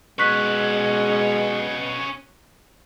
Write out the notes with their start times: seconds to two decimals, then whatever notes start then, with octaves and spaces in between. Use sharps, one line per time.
0.19 B2 G#3 C#4 B4 C#6 F#6 B6